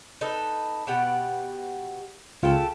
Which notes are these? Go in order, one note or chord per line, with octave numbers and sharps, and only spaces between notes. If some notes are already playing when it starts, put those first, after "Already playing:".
D#4 A4 B4
B2 G4 F#5
C#2 C#3 F4 G4 A4